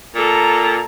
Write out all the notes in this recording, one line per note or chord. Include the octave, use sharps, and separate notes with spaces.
A#2 A4 A#5